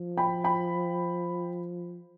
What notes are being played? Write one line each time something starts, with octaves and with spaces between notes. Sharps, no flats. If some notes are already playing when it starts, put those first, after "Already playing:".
Already playing: F3
G5 B5
G5 B5